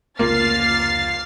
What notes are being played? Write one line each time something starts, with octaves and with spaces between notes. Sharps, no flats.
F1 C#2 A#3 F4 F6 A6 C7